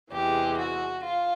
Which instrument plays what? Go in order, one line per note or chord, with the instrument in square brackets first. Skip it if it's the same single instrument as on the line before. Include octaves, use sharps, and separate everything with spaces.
[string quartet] E2 C3 E3 G#3 G4
F#4
F4